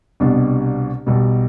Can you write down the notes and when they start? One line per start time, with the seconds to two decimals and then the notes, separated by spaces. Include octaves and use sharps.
0.20 C2 B2 G3 D4
1.07 B1 B2 G3